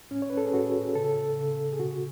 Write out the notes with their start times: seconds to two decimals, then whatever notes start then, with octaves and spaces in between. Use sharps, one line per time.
0.11 A2 C#4
0.22 C#5
0.30 B4
0.37 A4
0.45 G#4
0.53 A2 F#4
0.95 C#3 A4
1.37 C#3
1.72 G#4
1.79 B2 F#4